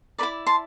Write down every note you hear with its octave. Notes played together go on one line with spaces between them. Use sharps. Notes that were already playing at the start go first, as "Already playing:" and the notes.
E4 B4 D5 B5 D6
A5 C6